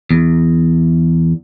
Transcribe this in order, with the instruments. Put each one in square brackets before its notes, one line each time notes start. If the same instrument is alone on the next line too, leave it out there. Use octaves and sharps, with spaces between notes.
[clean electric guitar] E2